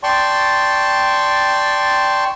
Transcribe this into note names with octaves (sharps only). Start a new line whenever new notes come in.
D5 G5 A5 C6 C#6